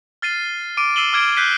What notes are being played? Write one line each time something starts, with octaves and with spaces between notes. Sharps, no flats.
F6 A6 C7 D#7
D6 D7 D#7
E6 C7 D#7 E7 F#7 G7
D6 F6 G#6 D7 D#7
F#6 G6 B6 C7 D#7